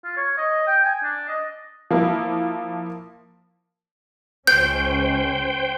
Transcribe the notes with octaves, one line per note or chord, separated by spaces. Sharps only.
F4
C#5
D#5
G5
G#5
D4
D#5
F3 A#3 E4
C#2 C#4 C5 G5 G6